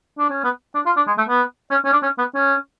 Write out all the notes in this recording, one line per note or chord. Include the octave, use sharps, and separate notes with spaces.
D4
C#4
B3
D4
F4
D4
G#3
A3
B3
C#4
C#4
D4
C#4
B3
C#4